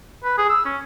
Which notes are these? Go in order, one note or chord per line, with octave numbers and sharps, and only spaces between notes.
B4
G#4
E6
C#4